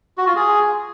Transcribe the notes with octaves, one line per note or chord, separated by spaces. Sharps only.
F#4
F4
G#4